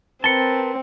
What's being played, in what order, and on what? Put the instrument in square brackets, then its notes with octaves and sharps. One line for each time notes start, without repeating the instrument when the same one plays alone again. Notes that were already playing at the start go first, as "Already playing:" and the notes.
[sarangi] C4 [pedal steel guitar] A#4 B4 A5 [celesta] C#7 G7